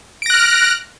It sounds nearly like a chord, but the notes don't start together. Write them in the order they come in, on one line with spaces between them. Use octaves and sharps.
D7 A#6 F#6 F6